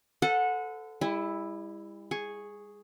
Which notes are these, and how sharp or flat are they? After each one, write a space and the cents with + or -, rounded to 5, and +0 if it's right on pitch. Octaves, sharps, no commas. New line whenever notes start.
A4 +0 C5 -45 F#5 -20
G3 +45 E4 +0
G#4 +0 C#6 -5